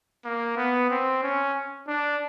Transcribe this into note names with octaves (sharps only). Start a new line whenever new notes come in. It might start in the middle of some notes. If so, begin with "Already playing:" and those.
A#3
B3
C4
C#4
D4